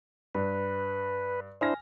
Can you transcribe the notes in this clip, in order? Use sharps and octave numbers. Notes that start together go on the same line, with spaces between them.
G2 B4
D4 E4 C5 G#5 F6 A#6